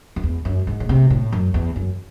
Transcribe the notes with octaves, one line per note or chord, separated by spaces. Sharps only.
F#2
E2
F#2
G#2
A2
C3
A2
F#2
E2
F#2